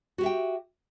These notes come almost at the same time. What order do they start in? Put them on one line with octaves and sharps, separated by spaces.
F#4 G4 E5 G5